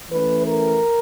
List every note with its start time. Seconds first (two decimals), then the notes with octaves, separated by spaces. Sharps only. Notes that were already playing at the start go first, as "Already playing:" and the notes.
0.11 E3 A3 C#4 B4
0.48 A#4